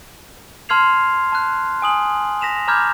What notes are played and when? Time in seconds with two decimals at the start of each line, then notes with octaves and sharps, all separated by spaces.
0.69 A5 C6 F6 G#6 C7 F7
1.32 A5 F#6
1.82 G#5 D#6 F#7
2.41 A#6 B6 E7 F7
2.68 A#5 B5 D6 F6 G6 G#6